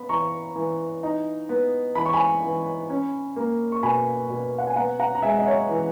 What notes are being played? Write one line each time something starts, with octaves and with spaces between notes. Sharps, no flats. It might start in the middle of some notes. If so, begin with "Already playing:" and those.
Already playing: B3 B5
E3 A#5 C#6
E3
D#4
B3
E3 B5
C#6
G#5 B5
E3
C#4
A#3
C#6
B2 G#5 B5
B2
F#5
G#5
B3 F#5 A#5
F#5 A#5
A#5
G#3 E5 G#5
D#5
C#5 E5
E3